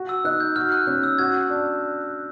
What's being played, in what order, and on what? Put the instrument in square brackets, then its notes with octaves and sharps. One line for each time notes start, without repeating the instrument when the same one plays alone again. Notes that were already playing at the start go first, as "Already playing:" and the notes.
Already playing: [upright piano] F#4
[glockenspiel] E6
[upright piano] D#4 [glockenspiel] F#6
[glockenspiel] G6
[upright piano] F#4 [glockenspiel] F6
[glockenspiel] F#6
[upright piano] C#4 [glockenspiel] F#6
[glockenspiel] E6
[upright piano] F#4 [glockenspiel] G#6
[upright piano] D4